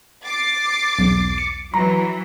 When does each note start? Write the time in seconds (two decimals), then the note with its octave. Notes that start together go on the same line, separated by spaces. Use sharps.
0.24 D6 A6 C7
0.99 B1 E2
1.38 C#7
1.74 E3 F#3 A#5